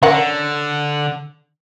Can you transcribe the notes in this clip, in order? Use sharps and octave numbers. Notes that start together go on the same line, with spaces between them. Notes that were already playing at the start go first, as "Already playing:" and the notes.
D3 C#4 A#4 F#5